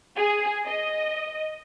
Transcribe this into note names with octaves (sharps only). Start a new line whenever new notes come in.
G#4
D#5